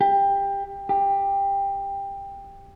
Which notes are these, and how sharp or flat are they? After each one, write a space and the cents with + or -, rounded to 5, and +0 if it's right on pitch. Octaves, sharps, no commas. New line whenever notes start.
G4 +20
G4 +15